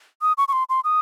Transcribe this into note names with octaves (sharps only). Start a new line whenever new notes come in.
D#6
C#6
C#6
C6
C6
D#6